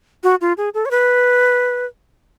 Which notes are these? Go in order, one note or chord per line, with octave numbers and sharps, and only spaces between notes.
F#4
F4
G#4
A4
C#5
B4